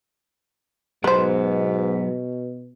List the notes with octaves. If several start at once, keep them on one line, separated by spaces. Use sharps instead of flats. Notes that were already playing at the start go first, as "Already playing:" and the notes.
G#2 B2 F#3 B3 B4 C5